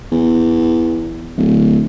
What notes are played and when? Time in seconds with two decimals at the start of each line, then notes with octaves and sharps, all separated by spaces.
0.12 E2
1.37 D1